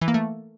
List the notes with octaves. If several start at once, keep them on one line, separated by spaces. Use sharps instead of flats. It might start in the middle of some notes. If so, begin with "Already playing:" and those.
E3
A#3
A3